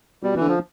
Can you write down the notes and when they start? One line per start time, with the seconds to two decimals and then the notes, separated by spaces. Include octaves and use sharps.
0.23 B2 G3
0.36 D3 E3
0.48 F3